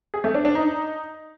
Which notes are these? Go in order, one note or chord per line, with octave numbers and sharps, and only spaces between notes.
G#4
A3
D4
D4
D#4